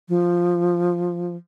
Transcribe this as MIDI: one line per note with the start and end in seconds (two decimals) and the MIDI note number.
0.09 1.35 53